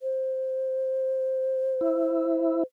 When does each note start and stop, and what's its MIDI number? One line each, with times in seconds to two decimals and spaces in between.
0.01 2.63 72
1.81 2.63 64